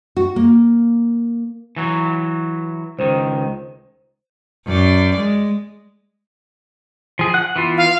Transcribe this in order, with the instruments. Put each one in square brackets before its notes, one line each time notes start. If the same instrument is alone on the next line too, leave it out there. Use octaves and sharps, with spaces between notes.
[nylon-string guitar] F#4
A#3
[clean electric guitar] E3 F#3
[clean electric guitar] C#2 D#3 [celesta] C5
[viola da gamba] F#2 D5
G#3
[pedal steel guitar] F3 G#4
F#5 F#6
E3 B3 F4
[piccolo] F5